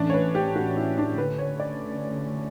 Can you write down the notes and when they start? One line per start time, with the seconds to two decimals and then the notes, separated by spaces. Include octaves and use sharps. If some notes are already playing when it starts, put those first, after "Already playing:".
Already playing: A2 E3 A3 C#4 D4
0.10 C#5
0.14 B4
0.35 G4
0.56 F#4
0.77 E4
0.98 D4
1.18 D3 A3 C#4 B4
1.38 C#5
1.60 D5